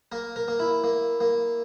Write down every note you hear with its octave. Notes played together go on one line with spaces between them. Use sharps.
A#3 A#4
A#4
A#3
E4
A#3
A#3